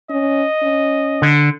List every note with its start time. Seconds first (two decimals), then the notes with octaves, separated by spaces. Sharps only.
0.10 C#4 D#5
0.62 C#4
1.22 D3